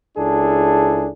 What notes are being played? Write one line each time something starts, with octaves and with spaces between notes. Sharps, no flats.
C#2 D4 E4 G#4 A4